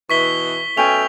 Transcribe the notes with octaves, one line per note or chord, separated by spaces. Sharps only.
B2 E3 C#6 B6 G7
B2 A3 C#4 G5 G#5 F7